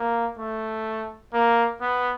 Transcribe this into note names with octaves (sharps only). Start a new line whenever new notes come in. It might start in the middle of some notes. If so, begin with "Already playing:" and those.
Already playing: A#3
A3
A#3
B3